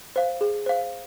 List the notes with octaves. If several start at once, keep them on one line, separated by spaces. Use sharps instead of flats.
C5 F5
G#4
C5 F5